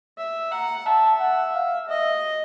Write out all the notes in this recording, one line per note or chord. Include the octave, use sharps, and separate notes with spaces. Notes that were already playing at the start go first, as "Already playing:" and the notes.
E5
F#5 A#5
E5 A5
F#5
F5
D#5 E5